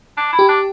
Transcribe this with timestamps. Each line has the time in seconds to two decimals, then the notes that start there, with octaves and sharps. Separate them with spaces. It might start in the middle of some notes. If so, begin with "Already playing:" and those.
0.17 D4
0.32 E4
0.39 G4
0.48 D4